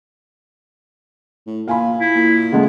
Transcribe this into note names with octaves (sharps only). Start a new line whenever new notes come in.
A2
A#2 F5 G#5 B5
E4
A#2
C#3 G#3 A3 B3